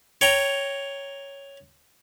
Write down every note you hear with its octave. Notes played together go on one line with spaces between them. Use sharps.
C#5 G5 A#5